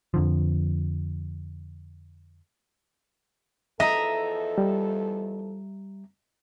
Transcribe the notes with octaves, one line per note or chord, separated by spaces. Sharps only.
F2 D3 F3
E2 F3 A4 D#5 E5 A#5
G3